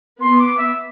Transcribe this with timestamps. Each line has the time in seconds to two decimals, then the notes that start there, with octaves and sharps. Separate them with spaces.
0.20 B3 C6
0.39 D6
0.58 E5